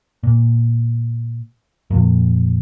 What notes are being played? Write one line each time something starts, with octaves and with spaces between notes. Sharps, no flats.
A#2
F2 A#2